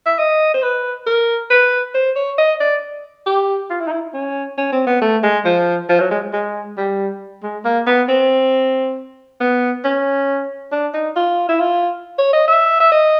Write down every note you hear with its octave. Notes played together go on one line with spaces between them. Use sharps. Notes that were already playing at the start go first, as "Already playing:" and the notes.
E5
D#5
C5
B4
A#4
B4
C5
C#5
D#5
D5
G4
F4
E4
D#4
E4
C#4
C#4
C4
B3
A3
G#3
F3
F3
F#3
G#3
G#3
G3
G#3
A#3
B3
C4
B3
C#4
D4
D#4
F4
E4
F4
C#5
D#5
E5
E5
D#5